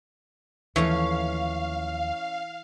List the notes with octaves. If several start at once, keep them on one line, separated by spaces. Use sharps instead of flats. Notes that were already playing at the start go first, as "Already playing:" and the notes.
D#2 E3 F3 A3 C#4 C#5 F5